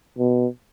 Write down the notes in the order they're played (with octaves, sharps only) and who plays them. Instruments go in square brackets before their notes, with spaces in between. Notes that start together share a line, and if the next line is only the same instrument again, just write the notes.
[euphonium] B2